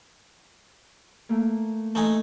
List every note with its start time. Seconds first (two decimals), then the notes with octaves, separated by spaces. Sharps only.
1.29 A3 A#3
1.95 A3 D#4 G#5